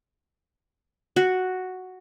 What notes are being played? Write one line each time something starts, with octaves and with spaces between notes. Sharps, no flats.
F#4